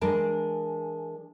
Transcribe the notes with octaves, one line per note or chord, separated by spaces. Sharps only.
E3 G#3 D4 A#4 A5